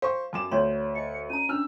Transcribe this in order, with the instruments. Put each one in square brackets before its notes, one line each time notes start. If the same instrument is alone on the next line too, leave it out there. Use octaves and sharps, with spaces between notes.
[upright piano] C5 C#6 [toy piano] F5
[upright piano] F#2 D6 E7
[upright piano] D2 [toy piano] C#5 D5 C6
[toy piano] D#5 [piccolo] C#7
[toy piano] C#4 A#5 [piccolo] D#7
[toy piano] C#4 D4 [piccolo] E6 [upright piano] F6